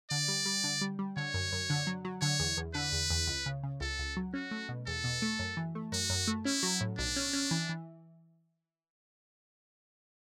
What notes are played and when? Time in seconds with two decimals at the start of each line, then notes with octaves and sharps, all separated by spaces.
0.11 D3 D5
0.28 G3
0.46 G3
0.64 D3
0.81 G3
0.99 G3
1.17 D3 C#5
1.34 F#2
1.52 F#2
1.70 D3
1.87 F#3
2.05 F#3
2.22 D3 C#5
2.40 E2
2.57 E2
2.74 D3 B4
2.92 E2
3.10 E2
3.27 C#2
3.46 C#3
3.63 C#3
3.81 C#2 A4
3.99 C#2
4.17 F#3
4.34 C#4 F#4
4.51 A3
4.69 B2
4.87 E2 A4
5.04 B2
5.22 A3
5.39 F#2
5.57 E3
5.75 A3
5.92 F#2 F#4
6.10 F#2
6.27 A3
6.45 C#4 E4
6.63 F#3
6.81 A2
6.98 B1 D4
7.16 C#4
7.33 C#4
7.51 E3
7.69 E3